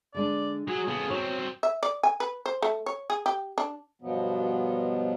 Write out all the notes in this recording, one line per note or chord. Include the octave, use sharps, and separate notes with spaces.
D3 G#3 D4 D5
F#3 G#4
C#3 B3 A4
F#3 C4 C#5
E5
D5
G#5
B4
C5
A3
C#5
G#4
G4
D4
G2 B2 F3 F#3 B3